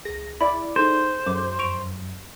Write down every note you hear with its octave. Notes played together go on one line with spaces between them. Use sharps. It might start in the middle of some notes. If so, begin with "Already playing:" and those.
C#2 G#4 A#6
E4 D5 E5 B5
D#4 G#4 A4 C5
F#2 D6
F2 C#6 D7 F7